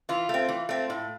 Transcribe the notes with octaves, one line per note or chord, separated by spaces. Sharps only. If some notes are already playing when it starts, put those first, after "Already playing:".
E3 F4
A3 C4
E3
A3 C4
A2